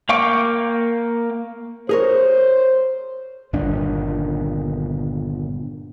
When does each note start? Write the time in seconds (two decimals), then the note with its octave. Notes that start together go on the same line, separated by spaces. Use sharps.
0.09 A#3 F5 G5 C#6 D6
1.89 G#4 A#4 C5 C#5
3.53 G1 A#2 D#3 D4